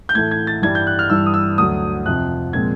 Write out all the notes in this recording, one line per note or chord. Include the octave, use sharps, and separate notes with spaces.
G6
A2 E3 A3 G#6
G#6
A6
G2 E3 G3 G#6
G6
F#6
F6
G2 E3 G3 E6
D#6
E6
D2 D3 F#3 D#6
F2 C3 F3 F#6
A#2 F3 G#3 C4 G#6